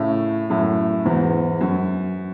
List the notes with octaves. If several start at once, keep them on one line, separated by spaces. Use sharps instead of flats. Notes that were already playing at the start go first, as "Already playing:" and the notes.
Already playing: A2 C#3
F#2 A2
E2 G#2
F#2